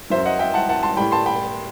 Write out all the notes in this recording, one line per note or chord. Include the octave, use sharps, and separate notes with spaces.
F#2 F#3 C5 E5
D#5 F#5
E5 G5
F#5 A5
F#5 A5
A5 C6
A2 G3 G5 B5
A5 C6
G5 B5